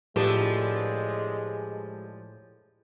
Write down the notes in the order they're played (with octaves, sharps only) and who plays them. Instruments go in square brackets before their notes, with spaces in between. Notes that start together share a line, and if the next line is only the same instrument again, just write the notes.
[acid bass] A2 [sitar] F3 D4 [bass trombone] G#3 [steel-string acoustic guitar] G4 A4 B4